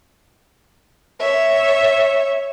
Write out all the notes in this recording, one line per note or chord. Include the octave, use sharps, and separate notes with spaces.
C#5 E5